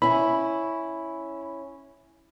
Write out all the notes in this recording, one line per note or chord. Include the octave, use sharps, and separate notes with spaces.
C#4 E4 B5